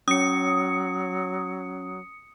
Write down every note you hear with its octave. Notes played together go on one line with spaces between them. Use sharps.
F#3 C#4 D#6 C#7